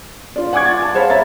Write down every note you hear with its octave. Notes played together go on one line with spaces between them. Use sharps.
F4 D5
F#5 G#5 C#6 D6 G#6
A6
A5
G#4 C5 C#5 F5 B5
E5 A#5 A6